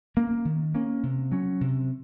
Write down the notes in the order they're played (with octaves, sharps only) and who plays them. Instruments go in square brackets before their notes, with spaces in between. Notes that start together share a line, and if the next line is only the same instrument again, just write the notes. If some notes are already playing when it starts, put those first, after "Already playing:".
[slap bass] A#3 C#4
D#3
A#3 C#4
C3
F#3 C#4
C3